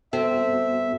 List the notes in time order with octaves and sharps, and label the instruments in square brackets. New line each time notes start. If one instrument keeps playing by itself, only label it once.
[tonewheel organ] G2 B3 F#4 [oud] C4 [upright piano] A4 [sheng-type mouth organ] E5